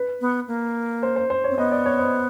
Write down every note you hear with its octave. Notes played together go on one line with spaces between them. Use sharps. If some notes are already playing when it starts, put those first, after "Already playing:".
Already playing: B4
B3
A#3
C5
C5
C5
C#5
C4
B3 D#5
D5
C#5
C5